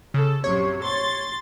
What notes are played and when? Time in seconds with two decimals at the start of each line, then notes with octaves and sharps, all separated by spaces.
0.14 C#3 A4
0.44 A#1 F#2 C3 C#5
0.83 C6 A6